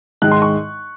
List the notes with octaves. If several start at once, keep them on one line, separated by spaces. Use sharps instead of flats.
G#2 D#3 G#3 F#6
C6
C#6